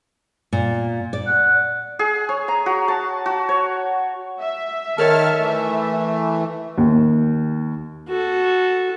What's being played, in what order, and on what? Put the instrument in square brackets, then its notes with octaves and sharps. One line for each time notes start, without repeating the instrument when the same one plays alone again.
[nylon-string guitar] A#2
D5
[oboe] F#5
[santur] G#4
C#5
A#5
F#4
A5
F#4
C#5
[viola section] E5
[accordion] D#3 A5 F6 [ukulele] A#4 B4 C#5
[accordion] E3 A3
[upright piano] D#2
[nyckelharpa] F#4 A4